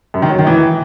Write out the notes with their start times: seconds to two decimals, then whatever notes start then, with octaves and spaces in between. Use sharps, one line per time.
0.14 F#2
0.22 D#3
0.30 F#3
0.38 D#3
0.47 E3